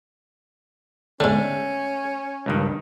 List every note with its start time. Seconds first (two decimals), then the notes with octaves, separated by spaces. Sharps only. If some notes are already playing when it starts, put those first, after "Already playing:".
1.20 G#2 D3 A3 C#4
2.46 C#2 G2 D#3